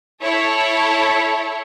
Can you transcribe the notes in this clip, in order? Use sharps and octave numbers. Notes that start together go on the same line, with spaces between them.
E4 A4 C#5